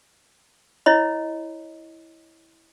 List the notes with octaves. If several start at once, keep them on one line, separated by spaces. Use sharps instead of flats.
E4 C#5 D#5 B5